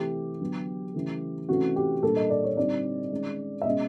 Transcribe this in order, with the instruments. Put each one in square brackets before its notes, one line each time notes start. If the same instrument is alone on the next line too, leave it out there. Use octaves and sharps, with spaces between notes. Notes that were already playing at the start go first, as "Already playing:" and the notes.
Already playing: [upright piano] C3 E3 A3 G4
D3 F#3 B3
C#3 E3 A3
C3 E3 A3 C#4 F#4
G4
A#2 G3 A#3 D4 A4
D#5
D5
C#5
D3 G3 C4 D#4 D5
D#3 G#3 C#4
E5
B2 G#3 C#4 D#5